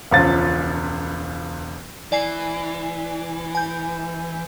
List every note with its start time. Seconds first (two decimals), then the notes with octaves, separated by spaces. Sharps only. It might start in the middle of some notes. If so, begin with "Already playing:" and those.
0.11 E1 C#2 F3 F4 A6
2.12 E3 D5 G#5 C7
3.55 G#5 G6